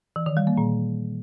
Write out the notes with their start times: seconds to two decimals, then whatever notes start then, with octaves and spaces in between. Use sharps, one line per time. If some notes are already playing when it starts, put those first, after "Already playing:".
0.16 E3
0.26 D#3
0.37 G3
0.47 A#3
0.57 A#2